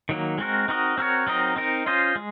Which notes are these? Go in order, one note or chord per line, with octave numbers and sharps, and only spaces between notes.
D#3 F#3 A#3
G#3 C4 F#4 A#4
C4 D#4 F#4 A#4 D#5
C4 F#4 A#4 C#5
F#3 C4 D#4 A#4 D#5
C4 D#4 A#4
C#4 F4 C5 D#5
G#3